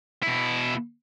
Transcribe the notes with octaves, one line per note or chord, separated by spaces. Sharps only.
B2 E4